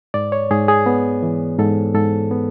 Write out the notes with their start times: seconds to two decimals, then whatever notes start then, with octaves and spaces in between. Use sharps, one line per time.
0.14 G#2 D5
0.32 C#5
0.51 G#2 G#4
0.68 G#4
0.86 B3
1.23 E3
1.59 G#2 A4
1.94 G#2 A4
2.31 B3